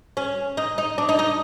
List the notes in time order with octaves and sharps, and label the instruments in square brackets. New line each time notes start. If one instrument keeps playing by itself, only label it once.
[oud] C#4
D#4
D#4
D4
D#4
D#4